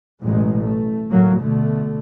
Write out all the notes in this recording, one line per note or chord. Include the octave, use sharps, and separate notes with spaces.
A1 F#2 B2 G#3
A3
D2 A2 F#3 A#3
B2 D3 A3